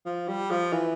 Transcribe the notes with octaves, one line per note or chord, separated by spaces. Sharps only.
F3
G3
F3
E3